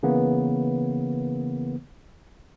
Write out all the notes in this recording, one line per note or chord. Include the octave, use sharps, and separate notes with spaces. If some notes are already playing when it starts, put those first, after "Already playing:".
C#3 E3 A#3 B3